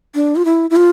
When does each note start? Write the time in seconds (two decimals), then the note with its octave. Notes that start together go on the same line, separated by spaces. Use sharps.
0.15 D4
0.36 F4
0.45 E4
0.70 E4
0.76 F4